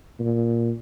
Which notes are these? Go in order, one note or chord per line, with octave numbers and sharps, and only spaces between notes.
A#2